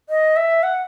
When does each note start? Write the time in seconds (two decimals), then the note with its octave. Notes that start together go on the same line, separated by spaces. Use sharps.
0.09 D#5
0.36 E5
0.63 F#5